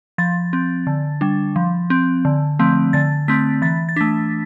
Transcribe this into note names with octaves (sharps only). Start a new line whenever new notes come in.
F3 A6
C4
D3
G3 D4
F3
C4
D3
F3 A3 C4
D3 A6
A3 C4 B6
E3 A6
A6
A3 D4 B6